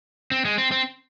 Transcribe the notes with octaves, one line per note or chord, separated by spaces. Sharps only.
C4
G#3
C4
C4